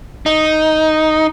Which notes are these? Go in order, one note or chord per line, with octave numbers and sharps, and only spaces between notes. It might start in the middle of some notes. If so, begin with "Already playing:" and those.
D#4